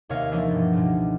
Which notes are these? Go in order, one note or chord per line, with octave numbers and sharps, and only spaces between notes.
D#2 C3 C#5 D#5 F5 F6
E3 F3 G#3 A#3 D4 D#4
G2 B2
C#2 B2